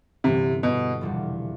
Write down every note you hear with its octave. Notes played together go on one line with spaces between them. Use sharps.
G1 G2 C3 E3
B2
F1 E2 B2 G3 D4